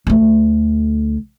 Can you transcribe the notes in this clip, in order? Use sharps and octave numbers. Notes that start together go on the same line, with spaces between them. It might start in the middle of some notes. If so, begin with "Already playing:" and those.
D2 A3